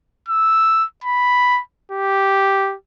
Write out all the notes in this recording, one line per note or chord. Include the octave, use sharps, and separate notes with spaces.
E6
B5
G4